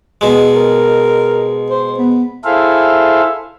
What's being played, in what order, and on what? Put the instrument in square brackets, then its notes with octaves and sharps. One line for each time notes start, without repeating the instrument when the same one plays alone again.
[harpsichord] B2 G#3
[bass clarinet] A#4
C5
B3
[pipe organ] E4 G#4 A4 C5 E5 F5